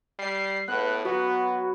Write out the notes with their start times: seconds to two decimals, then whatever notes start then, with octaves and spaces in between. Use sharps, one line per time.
0.19 G3 C7
0.68 A2 B3 F#6
1.05 F#3 B3 F#4